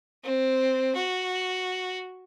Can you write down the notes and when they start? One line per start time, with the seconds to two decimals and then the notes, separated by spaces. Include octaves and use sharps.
0.24 C4
0.95 F#4